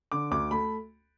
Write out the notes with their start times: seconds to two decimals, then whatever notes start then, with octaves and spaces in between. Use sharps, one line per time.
0.12 D3 D6
0.31 D2 D6
0.51 A3 B5